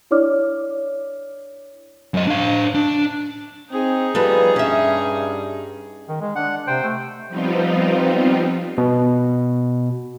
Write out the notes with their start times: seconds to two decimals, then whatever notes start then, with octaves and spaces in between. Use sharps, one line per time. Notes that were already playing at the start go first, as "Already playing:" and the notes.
0.11 D4 E4 C#5 D5 D6 F6
2.14 F#2 D#5
2.27 D4 F5
2.75 D4
3.71 C4 D#4 G#4
4.15 F3 G3 B3 A4
4.56 G2 C#4 E5
6.09 D#3
6.21 G#3
6.36 D4 F#5
6.67 C3 C5 G5
6.83 A3
7.29 F3 G3 B3 C4 D#4 F4
8.78 B2